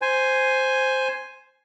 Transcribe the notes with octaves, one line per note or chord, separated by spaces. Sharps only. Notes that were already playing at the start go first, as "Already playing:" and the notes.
C5 G#5